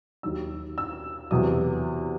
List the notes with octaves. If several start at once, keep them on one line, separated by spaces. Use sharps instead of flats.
D#2 D#3 F#3 E6
E6
E2 C3 F#3 D#6